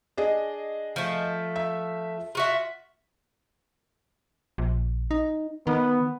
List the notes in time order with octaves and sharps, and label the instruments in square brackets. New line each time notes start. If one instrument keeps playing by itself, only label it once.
[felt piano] D4 G#4 D#5
[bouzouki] F3 A3
[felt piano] E5
[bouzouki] F4 F#4 E5
[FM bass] A#1
D#4
[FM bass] D#3 [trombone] B3